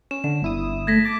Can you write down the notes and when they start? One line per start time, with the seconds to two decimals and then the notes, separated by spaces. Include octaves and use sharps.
0.11 C#4 E7
0.24 D3 E7
0.42 G1 E4 D#6
0.87 A3 G#6 A#6 B6
1.05 A5 D6